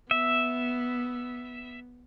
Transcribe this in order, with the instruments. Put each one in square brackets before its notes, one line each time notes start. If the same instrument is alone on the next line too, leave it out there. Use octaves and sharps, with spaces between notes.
[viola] B3 [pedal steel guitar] E5